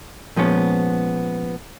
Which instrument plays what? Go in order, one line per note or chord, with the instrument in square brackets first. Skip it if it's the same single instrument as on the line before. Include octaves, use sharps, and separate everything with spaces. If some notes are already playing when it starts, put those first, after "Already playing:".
[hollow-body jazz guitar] A#2 F3 G#3 B3 C#4